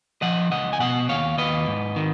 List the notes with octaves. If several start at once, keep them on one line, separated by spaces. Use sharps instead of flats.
F3 D#5 F#5
C#2 D#5 F#5
G#5
B2 D#5 F#5
D#2 C#5 F5
D#2 B4 D#5
G#2
D#3